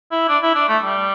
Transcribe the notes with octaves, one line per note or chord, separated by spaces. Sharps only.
E4
D4
E4
D4
A3
G3